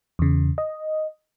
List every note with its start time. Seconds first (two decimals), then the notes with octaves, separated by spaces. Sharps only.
0.19 E2 C#3
0.58 D#5